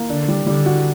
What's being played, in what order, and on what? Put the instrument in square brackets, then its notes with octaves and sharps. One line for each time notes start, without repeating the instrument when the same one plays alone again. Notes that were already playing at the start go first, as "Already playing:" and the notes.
Already playing: [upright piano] A#3
[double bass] D3 [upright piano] D4
[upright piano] G3
[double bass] D3 [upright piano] G3
[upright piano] F#4